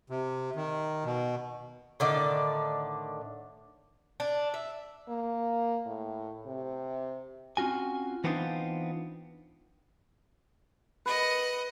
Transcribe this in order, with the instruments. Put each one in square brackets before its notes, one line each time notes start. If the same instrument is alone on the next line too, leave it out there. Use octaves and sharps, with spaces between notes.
[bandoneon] C3
D#3
B2
[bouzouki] A2 D3 D#3 D5
D4
E5
[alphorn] A#3
A2
C3
[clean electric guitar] C4 C#4 F4 F#4 G#5
E3 B3 C4 D4 D#4 F4
[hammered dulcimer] B4 [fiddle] D#5 F#5